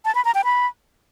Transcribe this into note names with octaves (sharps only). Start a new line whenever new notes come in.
A5
B5
A#5
G5
B5